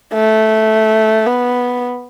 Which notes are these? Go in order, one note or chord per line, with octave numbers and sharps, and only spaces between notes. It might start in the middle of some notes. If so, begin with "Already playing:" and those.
A3
B3